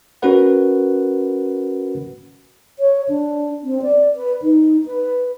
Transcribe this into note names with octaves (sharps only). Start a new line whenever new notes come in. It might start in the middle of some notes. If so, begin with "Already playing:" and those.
C#4 F#4 A#4 B4 F#5
C#5
D4
C4
D5
B4
D#4
B4